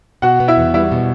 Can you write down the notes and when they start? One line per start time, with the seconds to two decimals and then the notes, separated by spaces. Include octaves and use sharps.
0.22 B2 F#4 F#5
0.40 B3
0.48 E4 E5
0.57 E2
0.74 G3 E4 E5
0.92 B2